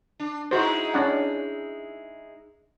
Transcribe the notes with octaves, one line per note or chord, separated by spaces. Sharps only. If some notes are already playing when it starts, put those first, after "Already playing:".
D4
G#3 D#4 E4 F#4 C5
C#4 D4 F#5